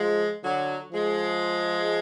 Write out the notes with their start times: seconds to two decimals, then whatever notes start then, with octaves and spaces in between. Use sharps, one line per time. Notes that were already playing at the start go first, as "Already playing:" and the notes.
Already playing: F3 G#3
0.43 D3 F#3
0.92 F3 G#3